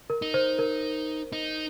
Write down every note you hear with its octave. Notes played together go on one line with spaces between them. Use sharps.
A#4
D#4
C5
A#4
D#4